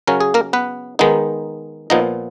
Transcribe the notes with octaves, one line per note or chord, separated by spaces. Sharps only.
C#3 F#3 C#4 A#4
G#4
A#3 A#4
B3 B4
D#3 G#3 B3 D#4
A#2 F3 B3 D#4 D#5